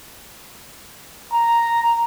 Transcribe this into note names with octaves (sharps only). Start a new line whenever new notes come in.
A#5